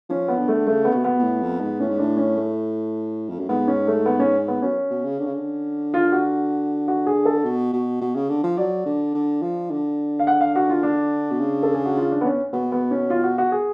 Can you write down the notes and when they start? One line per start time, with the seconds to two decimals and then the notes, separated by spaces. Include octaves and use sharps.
0.10 F3 C#4
0.28 B3
0.38 D3
0.48 A3
0.67 C#3 A3
0.85 B3
0.91 C#3
0.95 B2
1.04 B3
1.19 B2
1.23 A2
1.42 F2
1.61 G#2
1.79 A2 C#4
1.89 G#2
1.98 A2 D4
2.17 C#4
2.36 A3
3.29 F2
3.39 F#2
3.49 G#2 B3
3.68 C#4
3.87 A3
4.06 B3
4.19 C#4
4.48 B3
4.62 F#2 C#4
4.90 B2
5.04 C#3
5.19 D3
5.26 C#3
5.34 D3
5.94 F4
6.12 F#4
6.88 F#4
7.06 G#4
7.25 A4
7.44 B2
7.73 B2
8.01 B2
8.15 C#3
8.29 D3
8.44 F3
8.57 F#3 D5
8.86 D3
9.14 D3
9.42 F3
9.71 D3
10.19 F5
10.27 F#5
10.41 F5
10.56 F#4
10.69 F4
10.83 D4
11.31 B2
11.40 C#3
11.63 A4
11.74 G#4
11.85 F#4
11.97 F4
12.11 D4
12.21 B3
12.25 C#4
12.53 B2 B3
12.72 B3
12.91 C#4
13.10 F4
13.24 F#4
13.38 F#4
13.52 G#4